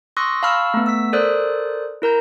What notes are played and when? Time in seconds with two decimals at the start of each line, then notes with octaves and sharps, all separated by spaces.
0.17 C6 C#6 D#6 E6 F#6 A#6
0.43 F5 A5 B5 C#6 E6 F6
0.74 A3 B3
0.86 E6 B6
1.13 A4 A#4 C5 D5 D#6 F#6
2.02 E4 A#4 A#5 G6